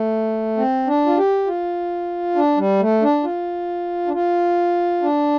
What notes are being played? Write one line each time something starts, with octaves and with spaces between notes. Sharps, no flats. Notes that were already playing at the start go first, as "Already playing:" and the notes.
Already playing: A3
C4
D4
F4
G4
F4
D4
G3
A3
D4
F4
D4
F4
D4